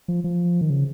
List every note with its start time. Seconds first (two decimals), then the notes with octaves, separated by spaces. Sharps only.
0.08 F3
0.24 F3
0.61 D#3
0.70 C#3